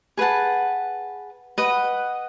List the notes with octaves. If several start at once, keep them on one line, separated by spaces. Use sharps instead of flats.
G#4 B4 F#5 A5
B4 D#5 F#5